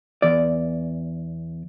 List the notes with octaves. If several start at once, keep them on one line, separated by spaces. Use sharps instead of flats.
E2 D5